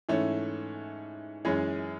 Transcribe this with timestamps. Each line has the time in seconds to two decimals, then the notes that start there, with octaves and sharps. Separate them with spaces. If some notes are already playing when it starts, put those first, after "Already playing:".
0.09 G#2 E3 A3 C#4
1.45 F#2 E3 G#3 C#4 G#4